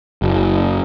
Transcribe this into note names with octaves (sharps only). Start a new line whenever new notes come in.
F#1